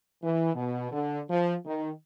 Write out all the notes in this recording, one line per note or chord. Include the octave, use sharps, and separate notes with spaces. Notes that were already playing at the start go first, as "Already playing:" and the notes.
E3
B2
D3
F3
D#3